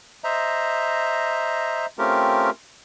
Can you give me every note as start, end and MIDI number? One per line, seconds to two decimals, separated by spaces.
0.24 1.86 72
0.24 1.86 75
0.24 1.86 76
0.24 1.86 82
1.98 2.50 57
1.98 2.50 60
1.98 2.50 61
1.98 2.50 65
1.98 2.50 67
1.98 2.50 70